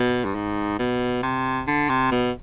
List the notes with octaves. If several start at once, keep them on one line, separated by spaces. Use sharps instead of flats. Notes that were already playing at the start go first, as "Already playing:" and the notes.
Already playing: B2
G2
G#2
B2
C3
D3
C3
B2